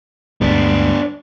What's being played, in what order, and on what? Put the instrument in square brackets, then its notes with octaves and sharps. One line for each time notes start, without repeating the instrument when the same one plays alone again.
[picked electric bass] D2 G2 G#3 [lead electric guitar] B3 D4